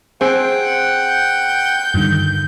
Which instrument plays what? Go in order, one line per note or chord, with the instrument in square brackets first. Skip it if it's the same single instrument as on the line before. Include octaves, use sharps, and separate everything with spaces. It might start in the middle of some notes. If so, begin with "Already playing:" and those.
[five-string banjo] C4 G#4 [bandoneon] F#5 G5
[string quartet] G6
[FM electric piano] G2 D3 D#3